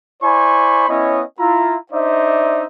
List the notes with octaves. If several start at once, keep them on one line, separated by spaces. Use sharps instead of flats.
E4 C5 D5 G#5 B5 C#6
B3 C#4 E4 C#5 D#5
E4 F4 A#5
D4 D#4 C5 D5 E5